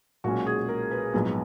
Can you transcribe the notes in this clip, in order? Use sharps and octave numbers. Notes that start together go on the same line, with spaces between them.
B1 A#2 G#3 C#4 F#4
G#4
A#4
B4
A#1 G#2 F#3 B3